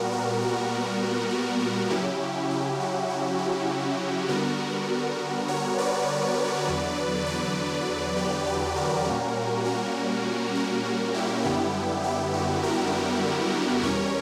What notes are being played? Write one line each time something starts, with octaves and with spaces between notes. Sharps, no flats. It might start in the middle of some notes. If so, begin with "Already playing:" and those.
Already playing: A#2 G3 B3 F#4 A#4
F#4
F#4
F#4
F#4
C#3 F#3 C#4 E4 G4
E4 G4
F#4
F#4
E4
D3 G3 B3 F#4 A#4
A#4 C#5
B4 D5
E2 D3 F#3
B4 D5
G4 B4
G4 B4
F#4 A#4
A#2 G3 A#3 C#4
F#4 A#4
F#4 A#4
F#4
E4 G4
F#2 D3 G3 B3 E4 G4
E4 G4
F#4
F#4 A#4
E2 B2 G3 C#4 A#4 C#5